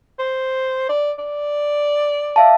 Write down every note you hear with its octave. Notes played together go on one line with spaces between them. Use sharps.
C5
D5
D5
E5 F5 A5